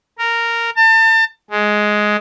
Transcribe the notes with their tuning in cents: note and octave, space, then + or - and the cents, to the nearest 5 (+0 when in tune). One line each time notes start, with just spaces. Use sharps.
A#4 -10
A5 +35
G#3 +10